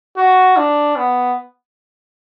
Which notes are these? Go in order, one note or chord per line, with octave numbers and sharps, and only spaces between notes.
F#4
D4
B3